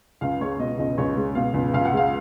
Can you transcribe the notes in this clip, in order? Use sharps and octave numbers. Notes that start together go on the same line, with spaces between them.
C#2 F5
G#3 C#5
B2 D#5
C#2 D#5
C#2 C#5
G#3
B2 F5
C#2
C#2 F5
F#5
G#3 F5